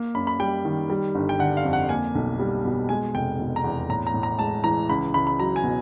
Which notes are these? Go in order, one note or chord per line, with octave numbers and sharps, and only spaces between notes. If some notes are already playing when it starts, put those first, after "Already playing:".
Already playing: A#3
F#2 B5
B5
G3 G5
D#3
G3
G1
G5
D3 F#5
F5
F2
F#5
A#3 G#5
B1
G3
B2
G#3 G#5
F1 G5
B2
A#5
E2
A2 A#5
A#5
A2
A#5
G#3 A5
E3 A#5
C#2 B5
C#2 B5
B5
F#3 A#5
G#5
B2